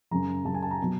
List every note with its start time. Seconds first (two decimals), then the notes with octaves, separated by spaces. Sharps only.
0.11 F#2 C#3 F#3 A#5
0.45 F#2 C#3 F#3 A5
0.54 G#5
0.62 A5
0.71 A#5
0.82 B2 F#3